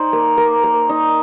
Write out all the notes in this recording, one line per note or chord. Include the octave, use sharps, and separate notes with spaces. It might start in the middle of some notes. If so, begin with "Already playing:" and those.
Already playing: D#4 C5
A#3
A#3
A#3
D#4